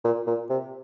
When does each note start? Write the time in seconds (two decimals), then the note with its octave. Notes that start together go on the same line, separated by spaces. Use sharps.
0.04 A#2
0.26 A#2
0.50 C3